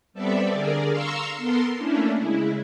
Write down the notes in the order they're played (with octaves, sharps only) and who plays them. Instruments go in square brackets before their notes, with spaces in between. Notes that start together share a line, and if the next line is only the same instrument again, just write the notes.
[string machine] G3 B3 C4 A4 D5 E5
D3 G#4 A#4 D5
F5 A#5 C6 C#6 E6
B3 A4 A#4 C6
A3 A#3 C#4 D4 E4
C#3 G#3 E4